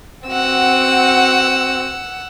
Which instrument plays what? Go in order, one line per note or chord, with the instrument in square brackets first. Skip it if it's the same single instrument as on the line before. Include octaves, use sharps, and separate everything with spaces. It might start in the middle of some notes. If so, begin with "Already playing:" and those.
[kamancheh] C4 F#4 [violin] F#5 E6